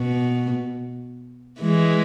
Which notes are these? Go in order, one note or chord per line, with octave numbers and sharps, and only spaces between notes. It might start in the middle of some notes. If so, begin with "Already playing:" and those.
Already playing: B2
E3 G#3